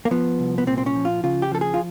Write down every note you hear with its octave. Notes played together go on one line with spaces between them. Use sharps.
A#3
F3 B3
C2
B3
A#2 C4
C4
C#4
F3
F4
C#3 F4
G4
F3 A4
G#4
F4